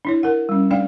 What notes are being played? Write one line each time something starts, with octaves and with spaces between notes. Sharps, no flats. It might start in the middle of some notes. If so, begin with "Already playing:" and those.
D4 E4 C#5
A#4 F#5
G3 C#4
A3 D4 D5 F5 G5